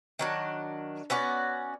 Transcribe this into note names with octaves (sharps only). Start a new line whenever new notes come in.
D#3 F#3 D4
B3 C#4 F#4 D5